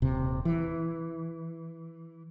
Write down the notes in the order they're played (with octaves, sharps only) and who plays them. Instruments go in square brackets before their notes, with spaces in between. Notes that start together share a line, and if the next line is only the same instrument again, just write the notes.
[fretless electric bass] D#1 C3
E3